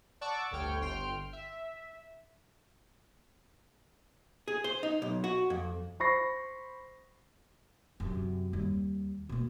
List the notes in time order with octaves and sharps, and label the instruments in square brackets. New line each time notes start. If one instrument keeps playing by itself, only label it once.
[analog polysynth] D5 F#5 A5 C#6 D6 E6
G1 D2 D3 C#5 G5 F6
G1 G5 C6 F6
E5
[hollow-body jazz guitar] G#4
C5
D#4
B1
F#4
F2
[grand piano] C5 B5 C#6 A#6 C7
[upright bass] F#2 C3
D#2 G3
B2 A#3